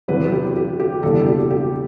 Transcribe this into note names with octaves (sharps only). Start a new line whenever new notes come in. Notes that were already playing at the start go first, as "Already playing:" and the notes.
E2 C3 F#3 B4
G4
G4
G4
F#1 E2 B2 G3 D4 A4
G4
G4